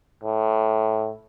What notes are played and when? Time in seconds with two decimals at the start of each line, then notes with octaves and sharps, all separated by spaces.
0.24 A2